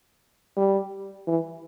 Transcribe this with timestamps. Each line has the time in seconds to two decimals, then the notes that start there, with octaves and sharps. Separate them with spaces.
0.56 G3
1.27 E3